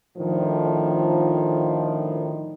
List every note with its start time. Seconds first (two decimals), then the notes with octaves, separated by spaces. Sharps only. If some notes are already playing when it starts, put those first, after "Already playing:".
0.18 A2 D3 D#3 F3